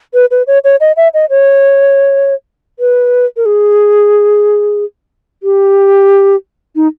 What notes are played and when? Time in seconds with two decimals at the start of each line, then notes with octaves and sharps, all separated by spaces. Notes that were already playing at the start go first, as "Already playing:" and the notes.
0.14 B4
0.31 B4
0.47 C#5
0.64 C#5
0.81 D#5
0.97 E5
1.14 D#5
1.30 C#5
2.79 B4
3.37 A#4
3.46 G#4
5.43 G4
6.76 D#4